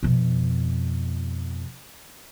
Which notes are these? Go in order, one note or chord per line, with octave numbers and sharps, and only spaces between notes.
F2 B2